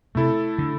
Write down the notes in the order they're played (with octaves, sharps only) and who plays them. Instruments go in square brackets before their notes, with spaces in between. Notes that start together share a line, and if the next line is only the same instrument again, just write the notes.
[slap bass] C3 [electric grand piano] A3 E4 A4
[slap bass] D3